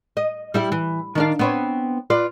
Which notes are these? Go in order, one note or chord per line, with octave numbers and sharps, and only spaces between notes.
D#5
G3 E4 G4
E3
D#3 D4 F5
B3 C4 C#5
F4 B4 D5